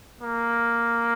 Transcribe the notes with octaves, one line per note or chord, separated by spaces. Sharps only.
A#3